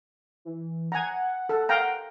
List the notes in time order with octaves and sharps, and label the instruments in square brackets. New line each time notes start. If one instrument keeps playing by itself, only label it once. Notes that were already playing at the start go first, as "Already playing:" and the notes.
[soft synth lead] E3
[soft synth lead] F#5 [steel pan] G#5 A#5
[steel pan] A4
F5 G5 A#5